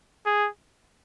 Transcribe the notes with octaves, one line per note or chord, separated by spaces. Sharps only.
G#4